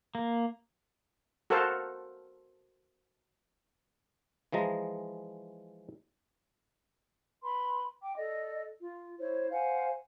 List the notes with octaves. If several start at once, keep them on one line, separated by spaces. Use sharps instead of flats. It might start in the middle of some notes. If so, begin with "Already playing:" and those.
A#3
F#4 A4 A#4 C5 F5 A5
E3 F3 G#3 A#5
B4 B5 C6
G5 D6
A4 D5 D#5
F4
E4 C5 C#5
C5 F5 F#5 G#5